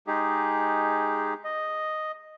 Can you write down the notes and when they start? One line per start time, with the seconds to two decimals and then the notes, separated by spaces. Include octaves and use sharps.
0.07 G#3 D#4 G4 G#4
1.44 D#5